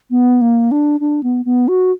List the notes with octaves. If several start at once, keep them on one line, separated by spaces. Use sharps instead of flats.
B3
A#3
D4
D4
B3
B3
F#4